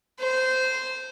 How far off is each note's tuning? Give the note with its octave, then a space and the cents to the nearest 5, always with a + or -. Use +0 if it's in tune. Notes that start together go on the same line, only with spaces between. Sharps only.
C5 -15